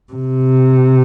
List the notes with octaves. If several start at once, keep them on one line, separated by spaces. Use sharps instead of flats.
C3